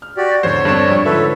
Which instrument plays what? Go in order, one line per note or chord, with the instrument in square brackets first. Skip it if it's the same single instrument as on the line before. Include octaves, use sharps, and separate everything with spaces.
[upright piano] F6
[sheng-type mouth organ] F#4 G4 D5
[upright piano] A#1 E2 D3 [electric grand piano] C5 [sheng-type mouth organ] C#5
[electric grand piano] G2 D4 E7 [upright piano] C4 A4
[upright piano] F2 G3
[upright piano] G#2 D3 F3 [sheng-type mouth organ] A4 B4 C#5 [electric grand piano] E5